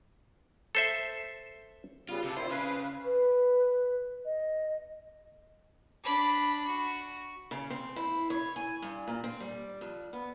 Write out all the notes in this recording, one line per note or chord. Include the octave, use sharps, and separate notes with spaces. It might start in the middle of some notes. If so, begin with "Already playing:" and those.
A4 C5 E5
C#3 G3 B3 F4
C3 A4
A#2 D#3 E4 C5
C#3 B4 F5
B4
D#5
D4 B5
F#4
C#3
C4
E4
C#5
G#5
G2
A#2
C4
G3
F2
B3